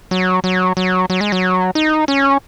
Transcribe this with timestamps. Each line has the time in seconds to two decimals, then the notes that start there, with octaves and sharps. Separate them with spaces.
0.11 F#3
0.44 F#3
0.77 F#3
1.10 F#3
1.21 G#3
1.32 F#3
1.75 D#4
2.08 C#4